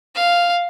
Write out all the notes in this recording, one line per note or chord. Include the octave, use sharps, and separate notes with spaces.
F5